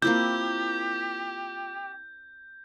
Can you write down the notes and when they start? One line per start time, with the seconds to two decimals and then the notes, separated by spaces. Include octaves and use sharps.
0.02 A#3 C4 E4 F4 G4 G6